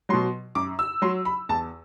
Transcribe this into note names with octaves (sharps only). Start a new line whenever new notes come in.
B2 F#3 C6
F#2 D6
E6
F#3 C6
B5
E2 A5